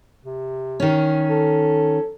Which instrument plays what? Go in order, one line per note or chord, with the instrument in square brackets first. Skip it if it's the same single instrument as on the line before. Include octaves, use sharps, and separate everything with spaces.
[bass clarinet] C3
[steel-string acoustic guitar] D#3 C#4
[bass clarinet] A4